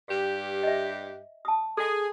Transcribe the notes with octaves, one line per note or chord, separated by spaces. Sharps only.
G2 G4
D#5 E5
A5 D#6
G#4 A4